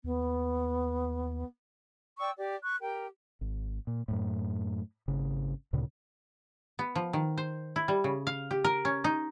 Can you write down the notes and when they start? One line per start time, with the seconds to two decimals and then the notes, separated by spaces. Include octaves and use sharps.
0.04 D#2 B3
2.20 D5 G5 C#6 E6
2.37 G4 D5
2.62 C#6 F#6
2.81 G4 A#4 G5
3.41 G#1
3.87 A#2
4.08 F#2 A2
5.08 G#1 C#3
5.73 D2 A#2 C#3
6.79 B3
6.96 F3
7.13 D#3
7.38 C5
7.76 E4
7.88 G3
8.04 C#3
8.27 F5
8.51 G4
8.64 A#4
8.85 C#4
9.04 D#4